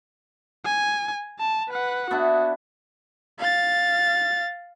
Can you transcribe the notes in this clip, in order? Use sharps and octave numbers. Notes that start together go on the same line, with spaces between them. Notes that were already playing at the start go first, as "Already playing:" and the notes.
G#5
A5
B4 F#5
B3 D4 E4 F#4
F5 A6